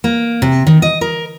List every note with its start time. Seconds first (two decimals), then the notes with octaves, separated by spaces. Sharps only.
0.04 A#3
0.42 C3
0.67 D#3
0.82 D#5
1.01 A#4